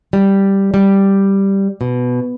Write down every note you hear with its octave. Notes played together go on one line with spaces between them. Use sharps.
G3
G3
B2